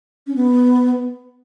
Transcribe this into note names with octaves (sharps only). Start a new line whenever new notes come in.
C#4
B3